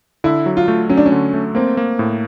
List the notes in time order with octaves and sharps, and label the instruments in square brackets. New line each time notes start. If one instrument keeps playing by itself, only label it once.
[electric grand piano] D3 [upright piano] E4
[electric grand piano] F#3
[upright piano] F4
[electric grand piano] A3
[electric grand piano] F#3 [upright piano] C#4
[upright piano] D4
C#4
[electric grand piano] D3
A3
[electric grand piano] A#3 [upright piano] C4
[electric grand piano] A#3
A2